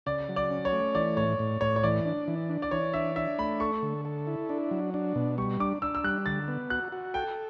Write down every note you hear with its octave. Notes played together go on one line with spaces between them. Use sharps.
C#3 D5
F#3
D5
C#4
C#5
A3
E3 D5
A2 C#5
A2
A2 C#5
C#5
E3 D5
D4
E3
D4
D5
E3 C#5
D4 E5
D4 E5
A3 B5
A4 C#6
D3
A4
E4
D4
F#3
D4
B2
G3 C#6
D4 D6
D4 E6
E6
G3 F#6
D3 A6
B3
F#4 F#6
F#4
A4 G5